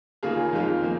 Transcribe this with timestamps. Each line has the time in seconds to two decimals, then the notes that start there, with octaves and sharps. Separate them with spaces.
0.23 D#2 C#3 A#3 F4 G#4
0.53 F2 D#3 G#3 F4
0.83 C#3 A#3